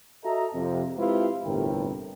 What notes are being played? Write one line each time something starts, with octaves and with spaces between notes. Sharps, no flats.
F#4 A4 D#5 E5 A#5
F2 C3
G#3 C4 E4 F4 G4 B4
G1 E2 A2 C3 A#4 G5